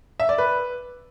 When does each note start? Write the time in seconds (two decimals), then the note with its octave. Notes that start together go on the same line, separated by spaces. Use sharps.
0.20 E5
0.29 D5
0.38 B4